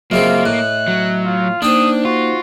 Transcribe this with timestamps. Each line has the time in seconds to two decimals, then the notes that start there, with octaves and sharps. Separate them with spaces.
0.11 F#2 C#3 A#3 C4 F4 D#5 E5
0.45 A2 F#6
0.88 F#3
1.25 F4
1.62 A#3 D4 D#4 C5 G5 D#6
2.05 F4 F#4